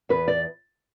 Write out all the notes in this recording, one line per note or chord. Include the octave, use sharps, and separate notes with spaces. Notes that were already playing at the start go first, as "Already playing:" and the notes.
E2 B4
D5